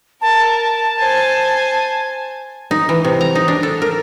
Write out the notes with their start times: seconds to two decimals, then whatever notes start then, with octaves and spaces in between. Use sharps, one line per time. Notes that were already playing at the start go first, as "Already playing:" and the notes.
0.21 A#4 A5
0.99 C5 G#5
2.71 D#4
2.89 E3
3.04 C3
3.21 A#5
3.35 D#4
3.48 D4
3.63 A4
3.82 A#4